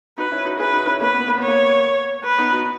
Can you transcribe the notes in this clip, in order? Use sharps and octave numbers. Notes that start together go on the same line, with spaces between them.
D#4 F#4 B4
C#4 E4
D#4 F#4
E4 G#4 B4
D#4 F#4
C#4 E4
A#3 C#4 B4
B3
A#3
B3 C#5
A#3
B4
B3 D#4
D#4 F#4